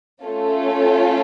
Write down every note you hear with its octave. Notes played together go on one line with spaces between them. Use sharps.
A3 C#4 F4 A4